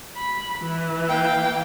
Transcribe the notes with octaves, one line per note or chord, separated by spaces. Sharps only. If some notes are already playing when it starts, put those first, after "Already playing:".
B5
E3
A#3 F5 G5